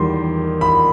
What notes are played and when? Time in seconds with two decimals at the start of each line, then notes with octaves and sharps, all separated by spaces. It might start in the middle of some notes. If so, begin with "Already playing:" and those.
Already playing: E2 D#3 G3 C6
0.61 B5